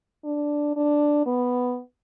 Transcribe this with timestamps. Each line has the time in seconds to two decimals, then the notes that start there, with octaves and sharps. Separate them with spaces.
0.24 D4
0.76 D4
1.26 B3